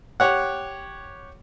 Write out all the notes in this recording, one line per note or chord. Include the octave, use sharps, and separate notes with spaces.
G4 C#5 F#5